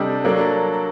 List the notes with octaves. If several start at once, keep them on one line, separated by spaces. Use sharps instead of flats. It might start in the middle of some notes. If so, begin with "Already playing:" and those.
Already playing: C3 G3 D4 A4 D#5
F#3 A#3 D4 A4 D5